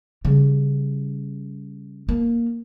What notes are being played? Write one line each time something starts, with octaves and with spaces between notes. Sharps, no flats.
C#3 G3
A#3